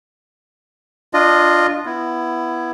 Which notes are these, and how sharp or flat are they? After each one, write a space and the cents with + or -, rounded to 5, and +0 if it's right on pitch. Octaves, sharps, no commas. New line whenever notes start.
D4 +0 F4 +0 D#5 -20
B3 +0 E4 +15